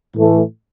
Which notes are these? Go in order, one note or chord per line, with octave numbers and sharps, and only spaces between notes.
A2 E3 A3